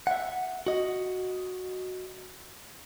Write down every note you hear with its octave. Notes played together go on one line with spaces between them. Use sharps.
E5 F#5
F#4 D#5